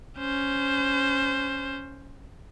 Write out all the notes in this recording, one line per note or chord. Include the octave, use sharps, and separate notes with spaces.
C#4 C5